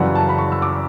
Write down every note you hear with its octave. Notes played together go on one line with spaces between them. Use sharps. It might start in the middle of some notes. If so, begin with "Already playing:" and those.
Already playing: F#2 C#3 E3 G3 F#5
A5
B5
C#6
E6
D6